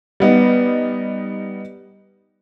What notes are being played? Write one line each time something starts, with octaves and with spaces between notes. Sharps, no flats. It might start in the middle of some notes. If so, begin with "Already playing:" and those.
G3 B3 D#4